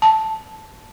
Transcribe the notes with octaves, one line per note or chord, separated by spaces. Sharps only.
A5